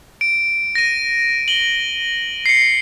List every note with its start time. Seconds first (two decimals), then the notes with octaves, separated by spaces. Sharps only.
0.21 D7
0.75 A#6 D#7
1.48 F#7 G7
2.46 C7 C#7